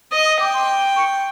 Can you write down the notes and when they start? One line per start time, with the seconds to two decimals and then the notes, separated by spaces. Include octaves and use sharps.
0.12 D#5 D#6
0.26 D#6
0.40 G5 D6
0.54 C6
0.96 C#6